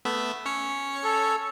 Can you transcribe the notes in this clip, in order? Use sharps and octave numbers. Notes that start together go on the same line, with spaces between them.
A3 B3 E5
C#4 C#5 C#7
A4